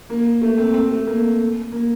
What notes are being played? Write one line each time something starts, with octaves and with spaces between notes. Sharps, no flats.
A#3
A3
C4
C4
A3
A#3
A#3